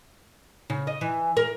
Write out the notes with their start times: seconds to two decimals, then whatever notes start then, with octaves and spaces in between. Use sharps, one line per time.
0.70 C#3
0.87 D#5
1.01 E3
1.37 A#4